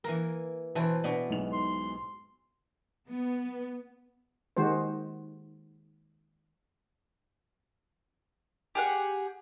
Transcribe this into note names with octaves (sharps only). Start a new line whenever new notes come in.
E3 A#3 A#4
B2 E3 B4 C5 A5
B2 B3 D4
B1 G#2 F7
C6
B3
D#3 G#3 F#4 G4 C5
G4 G#4 F#5